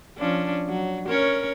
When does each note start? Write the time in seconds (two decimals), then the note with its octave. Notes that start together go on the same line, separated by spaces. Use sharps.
0.18 F3 C#4 D4
0.69 F#3
1.09 C#4 A#4 C#5